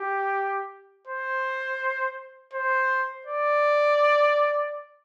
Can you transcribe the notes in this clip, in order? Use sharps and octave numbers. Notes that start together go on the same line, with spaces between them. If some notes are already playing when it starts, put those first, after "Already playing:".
Already playing: G4
C5
C5
D5